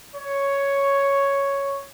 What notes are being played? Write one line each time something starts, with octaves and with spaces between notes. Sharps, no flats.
C#5